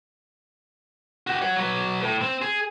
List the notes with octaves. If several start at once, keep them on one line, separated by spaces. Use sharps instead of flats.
F#4 G4
C#5 F#5
F#3 B4
A2
C4
G#4